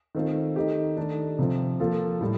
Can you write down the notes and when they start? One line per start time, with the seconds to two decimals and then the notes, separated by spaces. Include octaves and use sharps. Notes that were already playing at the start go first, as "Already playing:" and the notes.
0.15 D#3 A3 C4 F4 A4
0.56 D#3 A3 D#4 G4
0.97 D#3 A3 D4
1.39 C3 F3 C4
1.80 F3 A#3 F4 A4
2.21 A2 G3